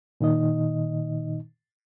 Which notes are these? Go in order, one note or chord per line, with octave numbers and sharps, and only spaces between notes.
A#2 D#3 D#4 D#5